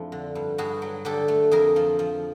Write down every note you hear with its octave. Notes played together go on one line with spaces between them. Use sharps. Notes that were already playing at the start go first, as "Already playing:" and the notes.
Already playing: F2 F3 A3 D4 E4
D3
G2
G2 F#4 G#4
F#3
D3 G4 A4
A3
F2 G#4 A#4
F3
F3